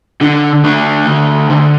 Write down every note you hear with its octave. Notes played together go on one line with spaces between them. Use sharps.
D3 D4
A3 D4
D3
D3